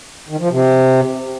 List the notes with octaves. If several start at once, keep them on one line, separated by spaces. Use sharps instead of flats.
D#3
F3
C3